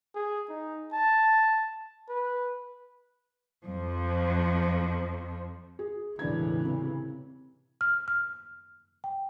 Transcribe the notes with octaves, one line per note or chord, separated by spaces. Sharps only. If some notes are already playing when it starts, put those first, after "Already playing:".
G#4
D#4
A5
B4
F2 F3
G#4
E1 A2 C#3 E3 D4 G#6
C3
F6
F6
G5